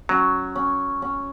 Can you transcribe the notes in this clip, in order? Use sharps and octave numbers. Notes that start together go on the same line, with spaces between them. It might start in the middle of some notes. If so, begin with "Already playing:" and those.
F#3 C#4
C#4
C#4